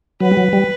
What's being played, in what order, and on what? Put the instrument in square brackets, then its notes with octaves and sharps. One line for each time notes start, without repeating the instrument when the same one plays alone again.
[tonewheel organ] F#3 [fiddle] B4
[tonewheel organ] G3
F#3
G3